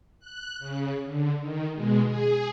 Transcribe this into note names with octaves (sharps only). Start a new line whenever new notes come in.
F#6
C#3
D3
D#3
B2 G#3
G#4